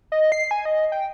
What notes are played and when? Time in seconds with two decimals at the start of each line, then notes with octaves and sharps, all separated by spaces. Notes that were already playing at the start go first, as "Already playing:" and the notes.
0.12 D#5
0.32 C7
0.51 G#5
0.65 D#5
0.92 G5